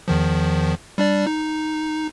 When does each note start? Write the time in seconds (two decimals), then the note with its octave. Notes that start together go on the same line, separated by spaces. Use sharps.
0.08 E2 D#3 F3
0.98 G3 D4 D5
1.27 D#4